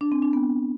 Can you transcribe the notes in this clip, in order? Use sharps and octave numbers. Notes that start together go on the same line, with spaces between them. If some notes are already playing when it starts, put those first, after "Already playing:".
D4
C4
D4
B3